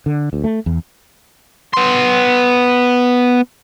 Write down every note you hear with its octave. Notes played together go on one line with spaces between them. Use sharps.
D3
D2
A3
E2
B3 C6